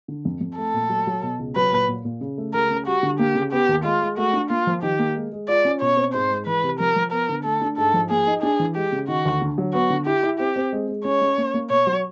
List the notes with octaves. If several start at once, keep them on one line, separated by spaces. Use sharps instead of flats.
D3
F2
F2
A3 A4
A#2
F#3
F#3
B2
C#2
F#3 B4
A#2
A#2
A#2
C#3
A3
C#2 A#4
C#3
G3 F#4
D3
A#3 G4
C#3
B3 G4
D#2
G#3 F4
G#3
A3 F#4
D4
A#3 F4
F3
D#3 G4
A#3
G#3
G#3
F4 D5
C#4
B2 C#5
C4
G#2 C5
G#3
E3 B4
C3
F3 A#4
F3
B3 A#4
D3
A3 A4
D4
G#2 A4
F3
A#3 G#4
D#4
D4 G#4
E3
G#3 G4
C#3
D#3 F#4
D2
D3
F#3
B3 F#4
D3
E4 G4
E4
C4 G4
C4
G#3
G#3
C#4 C#5
C#4
A#3
A#3
B2 C#5
F#3